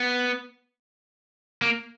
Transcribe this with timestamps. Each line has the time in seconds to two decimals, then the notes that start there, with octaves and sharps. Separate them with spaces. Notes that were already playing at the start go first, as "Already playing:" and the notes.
Already playing: B3
1.62 A#3